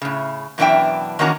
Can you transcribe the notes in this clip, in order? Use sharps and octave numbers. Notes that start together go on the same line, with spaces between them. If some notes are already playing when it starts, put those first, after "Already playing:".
A2 C#3
F#2 B2 E3 D4 E5 G5
D#3 E3 A#3 C#4 F#4 A#5